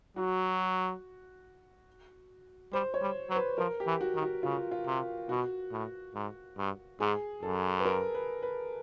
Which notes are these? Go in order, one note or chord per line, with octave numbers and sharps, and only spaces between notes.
F#3 F#4
G3 C5
C#5
G3
F#3 C5
B4
F3 A#4
G4
E3
F#4
D#3
F#4
C#3 F4
F4
C3
B2 F#4
A2
G#2
G2
G#2 G#4
F#2 A4
B4
A#4
B4
B4